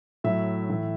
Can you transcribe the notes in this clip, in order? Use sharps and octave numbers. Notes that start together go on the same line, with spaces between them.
A2 F#3 E5
A2 E3